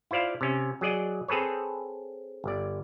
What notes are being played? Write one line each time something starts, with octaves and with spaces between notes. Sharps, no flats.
E4 F4 C5 D5 F5
C3 C#4
F#3 G#4 D5 D#5
C4 G#4 A4 B4 C#5
G1 D5